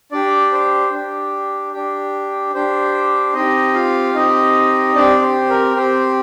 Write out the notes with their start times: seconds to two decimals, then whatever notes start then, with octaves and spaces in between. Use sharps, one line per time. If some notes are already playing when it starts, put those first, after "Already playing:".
0.12 D4 G4 D5
0.52 C5
0.93 D4 G4
1.73 D4 G4
2.54 D4 G4 C5
3.34 C4 D#4 G4 D#5
3.74 F4 F5
4.14 C4 D#4 G4 D#5
4.95 C4 D4 G4 D5
5.22 C5
5.50 A#4
5.76 C4 G4 C5